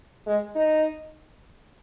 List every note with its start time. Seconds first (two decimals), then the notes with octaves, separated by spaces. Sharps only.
0.27 G#3
0.55 D#4